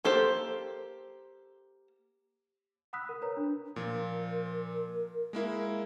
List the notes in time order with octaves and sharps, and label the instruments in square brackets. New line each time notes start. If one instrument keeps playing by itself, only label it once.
[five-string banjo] A#3 G4 A4 C5
[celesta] F#5 B5 D#6 E6 F#6 B6
A#4
A#4 B4 C#5 A#5
D4
[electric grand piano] A#2 F3 [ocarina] A#4
[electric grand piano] G#3 A#3 E4